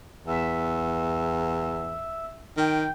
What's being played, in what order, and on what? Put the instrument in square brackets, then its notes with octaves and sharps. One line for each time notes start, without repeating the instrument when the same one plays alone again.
[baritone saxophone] E2 [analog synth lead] E5
[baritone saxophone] D#3 [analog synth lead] G5